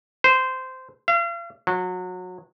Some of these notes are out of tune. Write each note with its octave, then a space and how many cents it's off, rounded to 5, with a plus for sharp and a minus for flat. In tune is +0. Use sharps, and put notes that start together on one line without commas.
C5 -15
F5 -40
F#3 -25